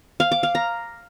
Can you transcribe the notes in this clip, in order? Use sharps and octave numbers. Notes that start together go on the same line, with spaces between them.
F5
D6
F5
A#5